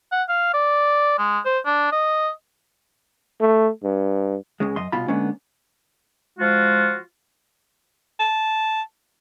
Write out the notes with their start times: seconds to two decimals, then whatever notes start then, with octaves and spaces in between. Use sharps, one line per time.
0.12 F#5
0.29 F5
0.54 D5
1.18 G#3
1.45 C5
1.65 D4
1.92 D#5
3.41 A3
3.84 G2
4.60 C#2 C#3 G#3
4.76 F#2 D#5 C6
4.92 C2 B2 F4 B5
5.08 D3 G#3 A#3 B3 C#4
6.39 F3 G#3 F4 F#4
8.19 A5